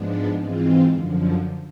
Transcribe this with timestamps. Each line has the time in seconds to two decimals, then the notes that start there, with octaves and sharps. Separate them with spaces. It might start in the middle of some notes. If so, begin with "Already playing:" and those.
Already playing: G#2 F3 G#3 B3 D4
0.37 G#2 E3 G#3 C4 F4
0.91 F#2 D3 F3